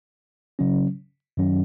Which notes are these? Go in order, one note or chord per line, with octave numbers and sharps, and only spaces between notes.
C#3 F#3 C#4
F#2 D#3 F#3 C#4